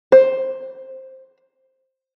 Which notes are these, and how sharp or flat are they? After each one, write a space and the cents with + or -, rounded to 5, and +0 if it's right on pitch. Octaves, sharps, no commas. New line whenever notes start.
C5 +10